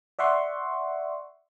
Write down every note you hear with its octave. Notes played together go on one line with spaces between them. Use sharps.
D5 E5 F#5 C6 C#6